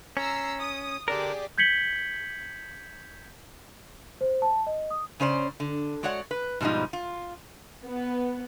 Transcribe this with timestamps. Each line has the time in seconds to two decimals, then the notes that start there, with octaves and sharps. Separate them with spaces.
0.17 C#4 A#5 E6 C7
0.59 D#6
1.08 D3 D4 G4 G#4 A#4 D5
1.58 G6 G#6 B6 C#7 F#7 G7
4.21 C5
4.42 A5
4.67 D#5
4.90 D#6
5.20 C#3 C#4 C5 D5
5.60 D3
6.03 G#3 F#4 C#5 D5 F#5
6.31 B4
6.61 G#2 B2 F3 G3 D#4
6.93 F4
7.85 B3